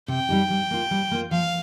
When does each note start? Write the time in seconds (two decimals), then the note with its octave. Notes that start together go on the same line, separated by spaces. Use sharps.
0.08 C3 G5
0.29 G3 D#4 G4
0.50 G3
0.71 A#3 F4
0.91 G3
1.11 A#3 F4
1.31 F3 F5